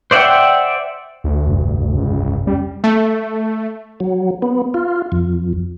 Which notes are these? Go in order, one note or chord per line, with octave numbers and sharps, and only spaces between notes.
C5 D5 E5 F#5 G5
D2
F1 G2
C#2
G3 C#4
A3
F#3
B3
F4
F2